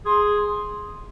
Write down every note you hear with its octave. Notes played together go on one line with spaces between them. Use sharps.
G#4 C6